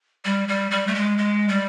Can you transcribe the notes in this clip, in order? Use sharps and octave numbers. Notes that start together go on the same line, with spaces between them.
G3
G3
G3
A3
G#3
G#3
G3